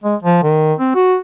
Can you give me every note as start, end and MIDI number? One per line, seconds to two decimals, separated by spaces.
0.04 0.16 56
0.23 0.39 53
0.43 0.74 51
0.80 0.91 60
0.95 1.17 66